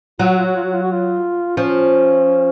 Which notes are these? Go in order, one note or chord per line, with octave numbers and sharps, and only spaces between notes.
F#3 F4
F#4
F4
F#4
F4
F#4
F4
F#4
F4
F3 C#4